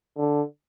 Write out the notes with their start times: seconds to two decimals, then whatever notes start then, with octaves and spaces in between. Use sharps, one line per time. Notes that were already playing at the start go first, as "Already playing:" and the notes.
0.18 D3